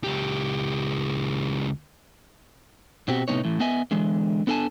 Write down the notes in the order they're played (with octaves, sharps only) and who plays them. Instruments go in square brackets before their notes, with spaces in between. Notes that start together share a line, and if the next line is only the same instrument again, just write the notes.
[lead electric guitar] C#2 G4
[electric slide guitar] B2 C4 F#4 G4
A2 C3 A#3 B3 D#4 C#5
A2 E3
B3 D#5 E5 G#5
D3 E3 G#3
B3 D4 A4 F5 G#5 A5